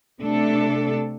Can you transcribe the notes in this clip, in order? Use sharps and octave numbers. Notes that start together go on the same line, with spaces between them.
C3 A3 D4 A4